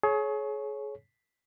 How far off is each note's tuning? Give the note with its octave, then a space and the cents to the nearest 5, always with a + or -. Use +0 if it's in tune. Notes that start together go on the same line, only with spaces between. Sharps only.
G#4 +35 C#5 -5